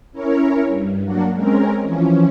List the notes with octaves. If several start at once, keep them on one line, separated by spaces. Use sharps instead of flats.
C#4 E4 A#4 C#5
G2
F#3 A#3 D4 F#4
G#3 C4 C#4 A#4
E3 F3 C#4